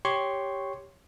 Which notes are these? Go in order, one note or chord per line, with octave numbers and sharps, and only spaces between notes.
G4 C#5 C6 C#6